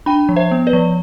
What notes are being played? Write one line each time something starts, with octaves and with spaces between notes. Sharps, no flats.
D4 G5 B5
F3
C5 E5
B3
B4 D5
F3